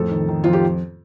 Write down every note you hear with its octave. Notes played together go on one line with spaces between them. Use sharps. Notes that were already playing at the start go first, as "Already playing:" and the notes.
Already playing: F2 A2 A4
D#3
D#3
F2 F4
G4